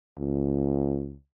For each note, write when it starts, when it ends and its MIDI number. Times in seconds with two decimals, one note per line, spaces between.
0.18 1.15 37